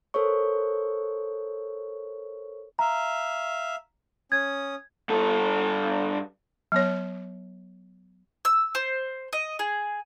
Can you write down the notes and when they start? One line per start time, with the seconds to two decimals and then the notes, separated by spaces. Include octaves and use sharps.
0.14 A4 A#4 C5 C#5 C#6
2.79 E5 F5 A#5
4.32 C#4 D#6 G#6
5.09 G2 A4
6.72 F#3 B3 C#5
8.45 E6
8.75 C5
9.33 D#5
9.59 G#4